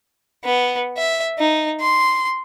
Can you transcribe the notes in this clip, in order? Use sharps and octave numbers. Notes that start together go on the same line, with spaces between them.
B3
E5
D#4
C6